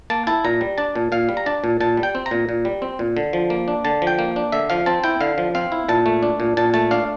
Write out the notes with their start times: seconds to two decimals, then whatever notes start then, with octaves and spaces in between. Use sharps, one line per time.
0.10 A#3 A5
0.27 E4 A5
0.45 A#2 A#5
0.61 G3
0.78 D4 A5
0.96 A#2
1.12 A#2 F5
1.29 G3
1.37 A#5
1.46 D4 A5
1.64 A#2
1.80 A#2 A5
1.97 G3
2.03 G5
2.15 C4
2.26 A#5
2.31 A#2
2.49 A#2
2.65 G3
2.82 C4
2.99 A#2
3.17 D3
3.33 F3
3.50 A#3
3.68 D4
3.85 D3 A5
4.02 F3
4.07 G5
4.19 A#3
4.36 D4
4.52 D3 E5
4.70 F3 F5
4.86 C4 A5
5.04 E4 G5
5.21 D3 F5
5.38 F3
5.55 C4 F5
5.72 E4
5.89 A#2 A5
6.06 A3
6.23 D4
6.40 A#2
6.57 A#2 A5
6.74 A3 A5
6.91 D4 F5